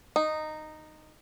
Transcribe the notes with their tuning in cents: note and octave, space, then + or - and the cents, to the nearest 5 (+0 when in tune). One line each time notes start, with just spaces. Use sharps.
D#4 -10